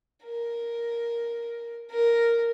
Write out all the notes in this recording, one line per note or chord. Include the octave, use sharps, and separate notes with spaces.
A#4
A#4